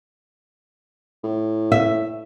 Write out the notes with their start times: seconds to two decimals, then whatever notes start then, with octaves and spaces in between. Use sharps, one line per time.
1.23 A2
1.72 E5